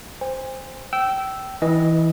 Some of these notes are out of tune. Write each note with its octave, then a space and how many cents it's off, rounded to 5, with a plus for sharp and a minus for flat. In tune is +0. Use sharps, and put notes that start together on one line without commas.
C5 +0 G#5 -45
G5 -25 E6 +0
E3 -15 D#5 +0